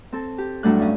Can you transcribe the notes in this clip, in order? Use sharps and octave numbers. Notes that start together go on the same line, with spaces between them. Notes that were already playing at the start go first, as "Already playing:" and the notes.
C4 A4
G4
A2 F#3 G3 A3 D4 F#6
G2 C#4